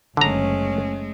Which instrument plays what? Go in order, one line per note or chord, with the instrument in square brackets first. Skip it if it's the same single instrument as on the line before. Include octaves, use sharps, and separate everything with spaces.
[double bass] F#1 C#4 [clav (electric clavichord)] D3 A#5 [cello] G#3 A3